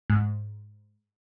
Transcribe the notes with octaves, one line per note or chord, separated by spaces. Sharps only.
G#2